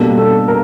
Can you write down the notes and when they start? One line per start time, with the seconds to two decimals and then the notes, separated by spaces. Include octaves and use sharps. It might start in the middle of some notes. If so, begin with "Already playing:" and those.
Already playing: B2 G3 A#3 D4 A4
0.18 A4
0.48 A#4